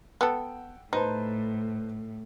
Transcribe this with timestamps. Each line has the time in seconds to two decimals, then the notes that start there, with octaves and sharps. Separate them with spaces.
0.21 B3 A4 F#5 G5 E6
0.93 A2 D#4 B4 C5 A5